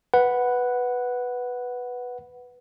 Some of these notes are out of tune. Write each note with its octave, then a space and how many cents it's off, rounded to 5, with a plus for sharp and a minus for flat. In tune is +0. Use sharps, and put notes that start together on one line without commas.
B4 +0 F#5 +0